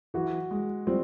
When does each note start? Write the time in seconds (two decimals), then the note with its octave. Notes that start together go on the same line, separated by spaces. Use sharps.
0.14 E3 F#3 F#4
0.51 G#3
0.87 F3 G3 C4